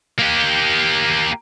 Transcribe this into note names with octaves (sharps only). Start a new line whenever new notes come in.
A#3 G4